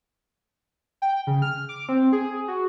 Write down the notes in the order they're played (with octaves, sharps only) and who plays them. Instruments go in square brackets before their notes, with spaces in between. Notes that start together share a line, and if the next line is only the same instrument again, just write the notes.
[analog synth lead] G5
C#3
F6
D6
C4
G#4
F#4